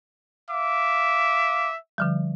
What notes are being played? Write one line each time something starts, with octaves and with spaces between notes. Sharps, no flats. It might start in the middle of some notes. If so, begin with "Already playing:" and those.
E5 F5 D6
D3 F3 G3